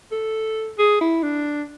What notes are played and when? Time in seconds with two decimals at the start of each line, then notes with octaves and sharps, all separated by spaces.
0.12 A4
0.78 G#4
1.01 E4
1.23 D4